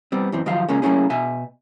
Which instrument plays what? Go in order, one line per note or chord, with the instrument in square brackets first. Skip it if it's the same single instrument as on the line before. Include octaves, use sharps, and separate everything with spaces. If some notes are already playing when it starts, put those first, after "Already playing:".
[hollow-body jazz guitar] G3 B3 C4
F#2 E3 C4
D#3 F3 F#3 G4 F5
C#3 G#3 A#3 C#4
F#3 A3 A#3 C#4 E4 G#4
B2 E5 G#5